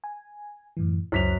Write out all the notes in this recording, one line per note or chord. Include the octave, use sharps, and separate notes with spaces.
G#5
F#2 A2 E3
C#2 F#2 C5 F#6 B6 F7